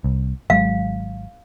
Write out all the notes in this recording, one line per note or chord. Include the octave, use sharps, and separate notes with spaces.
C2
G#1 F#3 G#3 F5